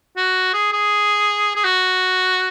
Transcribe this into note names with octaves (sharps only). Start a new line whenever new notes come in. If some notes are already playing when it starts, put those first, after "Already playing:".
F#4
G#4
G#4
G#4
F#4